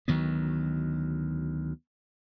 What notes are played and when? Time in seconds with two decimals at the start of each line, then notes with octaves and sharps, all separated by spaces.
0.08 D2 D#3 F#3 B3